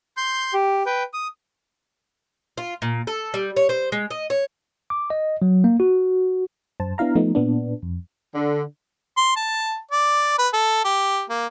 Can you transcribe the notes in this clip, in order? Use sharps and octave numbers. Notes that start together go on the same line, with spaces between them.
C6 G6
G4
B4 G5
D#6
F4
A#2
A4
G3
C#5
C5
G#3
D#5
C#5
D6
D#5
F#3
A#3
F#4
F#2 C5 A5
B3 D4 E4 F5 A#5
F3 A3 B3 D#4
A#2 B3 D4
F2
D3
C6
A5
D5
B4
A4
G4
A#3